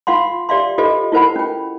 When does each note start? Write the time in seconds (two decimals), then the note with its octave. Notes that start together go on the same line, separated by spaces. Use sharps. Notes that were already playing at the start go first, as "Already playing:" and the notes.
0.07 F4 F5 F#5 C6
0.49 G4 D5 E5 F5 C6
0.78 F4 G4 A4 C5 D#5
1.12 E4 F4 A#4 C5 F#5 B5
1.36 C#4 G5